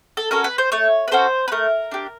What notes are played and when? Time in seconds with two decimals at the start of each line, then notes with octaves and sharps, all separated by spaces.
0.17 A4
0.31 C#4 F#4 A4 A#4
0.44 B4
0.58 C5
0.72 A3 C#5
1.08 B4
1.11 C#4 F#4 A4 C5
1.48 B4
1.52 A3 A#4
1.91 D4 G4